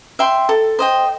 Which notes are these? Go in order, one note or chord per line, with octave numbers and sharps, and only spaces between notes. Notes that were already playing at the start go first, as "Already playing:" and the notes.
E5 G5 C6
A4
C5 D#5 G5